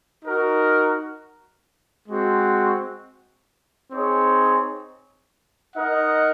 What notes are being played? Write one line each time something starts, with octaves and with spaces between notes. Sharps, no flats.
D#4 F#4 A#4
G#3 C4 F#4
C4 D#4 G#4 C#5
D#4 A#4 D#5 F#5